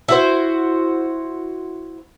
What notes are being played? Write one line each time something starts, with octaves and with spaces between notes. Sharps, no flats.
E4 F#4 C5